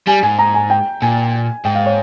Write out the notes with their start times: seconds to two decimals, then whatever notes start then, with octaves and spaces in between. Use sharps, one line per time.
0.07 G3 G#5
0.23 G#2 G#5
0.39 A#5
0.54 G#5
0.70 G5
1.02 A#2 G#5
1.65 G#2 G5
1.75 F5
1.86 C#5